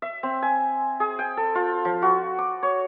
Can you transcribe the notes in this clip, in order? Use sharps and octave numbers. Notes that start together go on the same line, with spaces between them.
E5
C4
G#5
G#4
G5
A4
F4
F3
F#4
D6
C#5